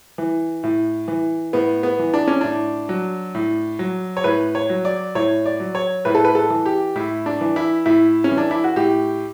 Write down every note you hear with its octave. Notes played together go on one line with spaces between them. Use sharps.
E3
A2
E3
A2 B3
B3
E3
D4
C#4
A2 D4
F#3
A2
F#3
C#5
A2 B4
C#5
F#3
D5
A2 C#5
D5
F#3
C#5
A2 B4
A4
B4
A4
E3
G4
A2 E4
D4
E3
E4
A2 E4
C#4
E3
D4
E4
F#4
A2 G4